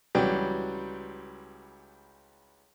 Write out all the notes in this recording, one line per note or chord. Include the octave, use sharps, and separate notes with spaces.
C#2 E3 F#3 G3 G5